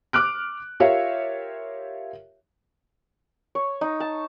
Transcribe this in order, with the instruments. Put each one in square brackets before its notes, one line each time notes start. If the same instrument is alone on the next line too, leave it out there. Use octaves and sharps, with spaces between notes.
[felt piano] D6 F6 F#6 D7
F4 G4 A#4 C#5 E5 F5
[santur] C#5
D#4
A5